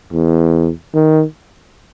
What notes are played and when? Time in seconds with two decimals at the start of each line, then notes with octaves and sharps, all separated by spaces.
0.13 E2
0.94 D#3